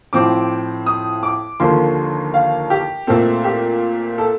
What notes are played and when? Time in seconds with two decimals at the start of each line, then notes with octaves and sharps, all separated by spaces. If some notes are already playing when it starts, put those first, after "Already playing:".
0.13 A2 F3 C4 D6
0.86 D#6
1.23 D6
1.60 D#2 D3 F3 A#3 C6
2.34 F5
2.70 G4
3.07 A#2 A3 C4 A4
3.44 G4
4.18 A4